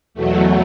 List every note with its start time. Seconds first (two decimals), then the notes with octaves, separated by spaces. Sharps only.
0.14 E2 B2 F#3 A3